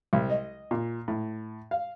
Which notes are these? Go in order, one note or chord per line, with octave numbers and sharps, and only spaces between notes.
C2
D#5
A#2
A2
F5